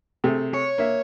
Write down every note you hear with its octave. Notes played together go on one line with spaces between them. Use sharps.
C3 A3 G#4
C#5
A#3 E5